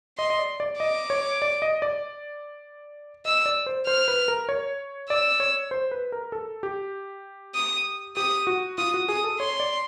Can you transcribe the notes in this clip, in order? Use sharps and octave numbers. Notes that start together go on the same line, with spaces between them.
D#5 C6
D#5
D5
D5
D#5 D6
C#5
D5
D#5
D5
D#5 E6
D5
C5
C5 F6
B4
A#4
C#5
D5 E6
C#5
C5
B4
A#4
A4
G4
D#6
G4 D#6
F#4
F4 D#6
F#4
G#4 D#6
A4
C#5 C6
D5